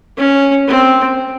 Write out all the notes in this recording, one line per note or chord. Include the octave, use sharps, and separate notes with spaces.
C#4
C4